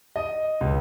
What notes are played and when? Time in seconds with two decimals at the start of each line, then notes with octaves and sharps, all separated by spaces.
0.16 D#5
0.61 C#2